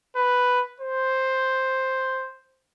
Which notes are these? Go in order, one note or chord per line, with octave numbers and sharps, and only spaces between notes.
B4
C5